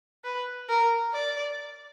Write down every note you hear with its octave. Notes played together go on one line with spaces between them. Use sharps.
B4
A#4
D5